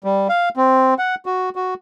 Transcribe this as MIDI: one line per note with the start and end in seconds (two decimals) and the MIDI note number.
0.04 0.28 55
0.29 0.49 77
0.57 0.94 60
0.99 1.15 78
1.26 1.49 66
1.56 1.74 66